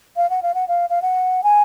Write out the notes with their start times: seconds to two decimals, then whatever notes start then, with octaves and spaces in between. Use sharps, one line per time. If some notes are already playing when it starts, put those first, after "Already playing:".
0.16 F5
0.30 F#5
0.43 F5
0.54 F#5
0.68 F5
0.90 F5
1.02 F#5
1.43 G#5